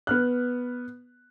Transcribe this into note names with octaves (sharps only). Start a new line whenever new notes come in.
B3 F6 F#6